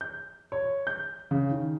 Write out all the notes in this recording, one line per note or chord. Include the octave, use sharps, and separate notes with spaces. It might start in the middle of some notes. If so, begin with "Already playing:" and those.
G6
C#5
G6
C#3
D#3